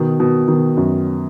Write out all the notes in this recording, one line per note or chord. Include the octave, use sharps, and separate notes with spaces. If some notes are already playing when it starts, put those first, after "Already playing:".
Already playing: B2 D#3
B2 D#3
B2 D#3
F#2